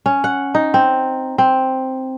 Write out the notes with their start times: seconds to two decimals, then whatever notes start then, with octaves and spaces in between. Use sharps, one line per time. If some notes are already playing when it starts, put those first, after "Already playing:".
0.06 C#4
0.24 F#5
0.55 D#4
0.74 C4
1.38 C4